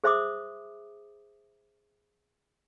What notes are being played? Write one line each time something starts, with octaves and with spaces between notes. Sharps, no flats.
G#4 C5 E5 C6 D6 D#6